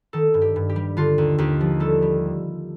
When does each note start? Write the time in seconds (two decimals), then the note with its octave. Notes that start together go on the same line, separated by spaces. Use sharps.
0.13 D#3 A4
0.34 G2
0.42 G4
0.56 G2
0.69 G4
0.76 G3
0.97 D3 F4
1.18 D#2
1.38 D#2 G4
1.61 F3
1.80 G3 A4
2.02 G3